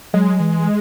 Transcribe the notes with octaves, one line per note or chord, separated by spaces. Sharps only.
F#3 G#3
E3